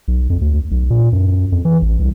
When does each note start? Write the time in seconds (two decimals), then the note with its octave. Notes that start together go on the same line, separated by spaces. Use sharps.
0.08 B1
0.30 F2
0.41 D2
0.71 B1
0.90 A#2
1.12 F#2
1.52 F2
1.65 E3
1.82 A1
1.99 C2